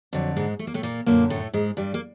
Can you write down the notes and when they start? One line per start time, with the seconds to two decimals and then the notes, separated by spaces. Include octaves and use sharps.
0.13 F2 D3 F#3
0.36 G#2 G#3
0.59 A3
0.67 A#3
0.74 A2 A3
0.83 A#2 A#3
1.06 F#2 A#2 D3 A#3
1.30 A2 A3
1.53 G#2 G#3
1.77 G2 G3
1.94 A#3